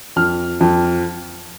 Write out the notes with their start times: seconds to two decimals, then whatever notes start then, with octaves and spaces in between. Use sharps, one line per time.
0.16 F2 F6
0.61 F2